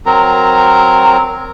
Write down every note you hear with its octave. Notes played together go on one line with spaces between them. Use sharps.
F#3 C4 A#4 A#5